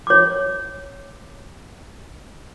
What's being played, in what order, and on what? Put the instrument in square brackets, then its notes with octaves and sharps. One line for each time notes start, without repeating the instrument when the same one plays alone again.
[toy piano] C#5 D6